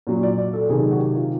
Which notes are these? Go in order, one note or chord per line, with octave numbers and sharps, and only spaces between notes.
A#2 F#3
D5
D5
A4
C3 D#3 F#3 G#4
F#4
G4
F4